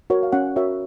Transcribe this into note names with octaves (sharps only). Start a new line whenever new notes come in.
F#4 A#4 C#5
F5
C#4 F#5
F#4 A#4 C#5 E5